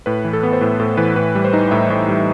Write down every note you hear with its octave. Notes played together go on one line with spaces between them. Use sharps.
A2 B4
E3
A4
B3
C5
A2 B4
A2 A4
E3 B4
A2 B4
G3
C5
D#4
A2 E5
A2
G3